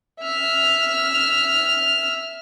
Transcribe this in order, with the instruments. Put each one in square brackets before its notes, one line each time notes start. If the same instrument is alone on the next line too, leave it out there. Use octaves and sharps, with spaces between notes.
[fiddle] E5 F6